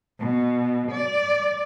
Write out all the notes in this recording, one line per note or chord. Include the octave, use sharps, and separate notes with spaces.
B2
D5